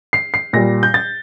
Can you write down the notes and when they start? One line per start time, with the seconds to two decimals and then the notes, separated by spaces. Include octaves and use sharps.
0.13 C7
0.34 C7
0.53 A#2 G3 A#6
0.83 G6
0.94 A6